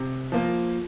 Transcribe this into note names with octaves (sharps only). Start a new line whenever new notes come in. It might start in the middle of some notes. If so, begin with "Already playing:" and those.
Already playing: C3
F3 A#3 F4 A#4